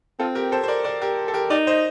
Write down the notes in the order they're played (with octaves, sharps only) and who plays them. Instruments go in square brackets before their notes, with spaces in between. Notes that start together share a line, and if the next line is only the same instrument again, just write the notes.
[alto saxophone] C4 [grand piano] F4 A4
[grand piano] G4 A#4
A4 C5
C5
A#4 D5
A#4 D5
G4 A#4
A4
G4 A#4
[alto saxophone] D#4 [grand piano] A#4 D5
[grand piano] C5 D#5